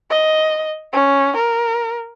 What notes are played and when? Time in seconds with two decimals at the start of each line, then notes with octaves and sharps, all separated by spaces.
0.10 D#5
0.93 C#4
1.36 A#4